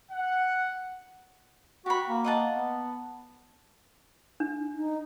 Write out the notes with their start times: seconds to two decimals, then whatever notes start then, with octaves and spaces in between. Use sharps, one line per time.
0.11 F#5
1.86 F#4 G4 B5
2.08 A#3
2.24 D#5 F#5 A5
2.55 B3
4.40 D4
4.75 D#4